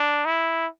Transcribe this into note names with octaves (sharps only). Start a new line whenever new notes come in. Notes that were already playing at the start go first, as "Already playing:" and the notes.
Already playing: D4
E4